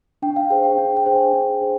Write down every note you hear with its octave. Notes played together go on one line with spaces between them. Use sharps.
D4 G5
F5
G#4 C5 G5
G5
D4 G5
G5
G#4 C5
G#5
D4
G#4 C5